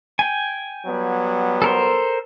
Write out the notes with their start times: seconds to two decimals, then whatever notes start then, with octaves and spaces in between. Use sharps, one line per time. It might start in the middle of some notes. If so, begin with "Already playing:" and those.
0.19 G5 G#5
0.86 F#3 G3 B3
1.62 A4 A#4 C5